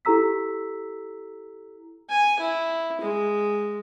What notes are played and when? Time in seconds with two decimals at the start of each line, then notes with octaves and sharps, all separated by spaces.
0.05 E4 G4 A4 A#5 E6 B6
2.09 G#5
2.40 E4
3.01 G#3